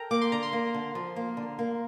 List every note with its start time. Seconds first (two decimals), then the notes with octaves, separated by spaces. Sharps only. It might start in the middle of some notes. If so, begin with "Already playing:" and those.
Already playing: A4 A#4 G5 A#5
0.11 A#3 D6
0.21 C6
0.32 D3 A#5
0.43 C6
0.53 A#3
0.74 D3
0.95 F3
1.16 A#3
1.37 D3
1.59 A#3